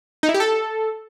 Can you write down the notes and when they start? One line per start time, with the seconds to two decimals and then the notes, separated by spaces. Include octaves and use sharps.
0.23 D#4
0.29 E4
0.34 G4
0.40 A4